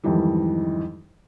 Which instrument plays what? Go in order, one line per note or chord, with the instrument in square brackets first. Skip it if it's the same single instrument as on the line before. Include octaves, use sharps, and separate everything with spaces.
[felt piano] F2 G#2 D#3 E3 G3